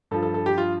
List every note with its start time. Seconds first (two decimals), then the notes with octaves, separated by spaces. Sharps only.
0.11 G2 F3 A4
0.23 A4
0.34 A4
0.46 G4
0.58 F4